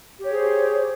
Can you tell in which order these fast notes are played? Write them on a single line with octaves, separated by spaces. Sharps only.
G4 C#5 G#4 C5